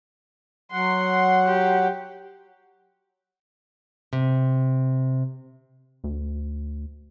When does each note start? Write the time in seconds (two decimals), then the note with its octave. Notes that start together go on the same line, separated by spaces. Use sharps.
0.72 F#3 F#5 C6
1.45 G4
4.13 C3
6.04 D2